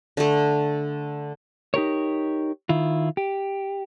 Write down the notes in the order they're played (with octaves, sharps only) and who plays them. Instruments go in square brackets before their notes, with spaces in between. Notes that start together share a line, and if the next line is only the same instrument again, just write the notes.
[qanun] D3 A3
[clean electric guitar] D#4 G4 A#4 C#5
D#3 E4 F4
G4